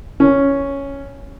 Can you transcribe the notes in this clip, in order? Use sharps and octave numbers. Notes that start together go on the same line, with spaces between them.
C#4